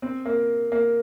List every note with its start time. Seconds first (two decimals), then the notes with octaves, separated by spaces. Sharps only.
0.02 C4
0.26 A#3
0.72 A#3